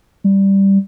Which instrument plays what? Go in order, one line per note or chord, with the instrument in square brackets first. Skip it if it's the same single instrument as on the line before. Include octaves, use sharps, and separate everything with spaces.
[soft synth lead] G3